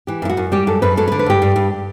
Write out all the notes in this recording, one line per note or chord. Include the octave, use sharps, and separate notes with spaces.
E3 G4
F#2 E4
F#4
F#2
G3 G4
F#2 A4
F#2 B4
F#3 A4
B4
D3
B4
G2 G4
G2
G2